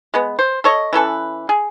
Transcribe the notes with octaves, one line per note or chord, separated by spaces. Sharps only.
G#3 B3
C5
A4 C#5 D#5
E3 C#4 A4 B4
G#4